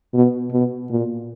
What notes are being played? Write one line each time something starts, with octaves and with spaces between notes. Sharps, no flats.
B2
B2
A#2